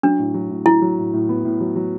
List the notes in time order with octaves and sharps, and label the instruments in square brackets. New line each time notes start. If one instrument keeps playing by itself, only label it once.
[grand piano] F#3 [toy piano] D4
[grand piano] A2
F#3
A2
[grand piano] F#3 [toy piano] E4
[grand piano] F#3
A2
A2
B3
A2
F#3
F#3